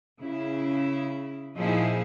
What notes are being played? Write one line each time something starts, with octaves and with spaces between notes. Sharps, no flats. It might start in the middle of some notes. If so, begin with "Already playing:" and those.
C#3 E4
A#2 F3 D#4 E4 G#4